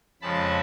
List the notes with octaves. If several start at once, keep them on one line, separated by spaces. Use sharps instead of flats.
F2 C#3 F3 G#3 C#4 A5 B5